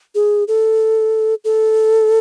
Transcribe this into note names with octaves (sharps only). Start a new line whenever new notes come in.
G#4
A4
A4